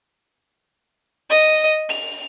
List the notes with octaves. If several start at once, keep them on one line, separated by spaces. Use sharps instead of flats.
D#5
F7